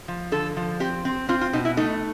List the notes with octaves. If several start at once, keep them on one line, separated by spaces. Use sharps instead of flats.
F3
D3 A4
F3
C4 G4
C4
C4 F4
F4
B2 D#4
E4
A3 D#4